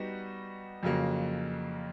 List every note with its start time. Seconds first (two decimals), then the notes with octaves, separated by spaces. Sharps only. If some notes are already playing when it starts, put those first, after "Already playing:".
Already playing: G3 B3 D#4 F#4
0.83 F2 C#3 F#3 A#3